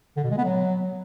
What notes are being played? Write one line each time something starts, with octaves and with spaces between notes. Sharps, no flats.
D3
B2
G#3
B3
F#3